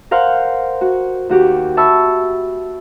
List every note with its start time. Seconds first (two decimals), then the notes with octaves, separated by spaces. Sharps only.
0.11 A#4 C5 F5 F#5
0.81 F#4
1.29 D#2 F#4 G4
1.77 E5 A5 B5 C#6 E6